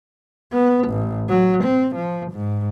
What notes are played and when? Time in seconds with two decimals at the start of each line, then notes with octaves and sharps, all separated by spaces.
0.52 B3
0.88 A1
1.29 F#3
1.64 C4
1.95 F3
2.32 G#2